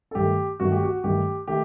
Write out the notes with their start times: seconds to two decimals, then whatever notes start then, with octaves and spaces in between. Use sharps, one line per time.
0.11 A4
0.15 G2 D#3 A3 G4
0.60 G2 D#3 A3 F#4
0.72 G4
0.83 F#4
1.04 G2 D#3 A3 G4
1.48 D#3 A3 G4